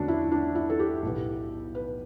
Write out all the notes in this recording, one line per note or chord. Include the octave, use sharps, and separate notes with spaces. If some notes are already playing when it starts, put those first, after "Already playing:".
Already playing: E2 D3 A3 C#4 D4 F#4
E4
D4
E4
A4
G4
B1 A2 E3 B3
B4